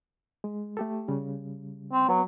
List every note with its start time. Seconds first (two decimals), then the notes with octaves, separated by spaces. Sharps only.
0.44 G#3
0.77 A3 G4 A4
1.08 C#3 G3
1.92 C4
2.09 F#3 B3